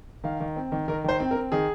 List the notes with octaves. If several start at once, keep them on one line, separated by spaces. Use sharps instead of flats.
D#3 F5
D#3
C4
D#3
D#3 A#4
D#3 C5
C4
A#4
C4
D#3 G#4